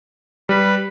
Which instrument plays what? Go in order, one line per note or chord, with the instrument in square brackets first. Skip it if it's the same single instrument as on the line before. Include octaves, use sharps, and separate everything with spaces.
[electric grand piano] G3 [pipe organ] B4